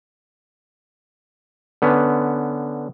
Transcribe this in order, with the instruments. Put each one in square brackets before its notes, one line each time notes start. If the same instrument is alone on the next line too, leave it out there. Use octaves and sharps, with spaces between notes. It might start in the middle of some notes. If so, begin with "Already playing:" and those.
[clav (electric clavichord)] D3 B3 C#4